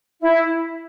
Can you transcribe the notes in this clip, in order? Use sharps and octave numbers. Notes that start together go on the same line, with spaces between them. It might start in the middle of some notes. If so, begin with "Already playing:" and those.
E4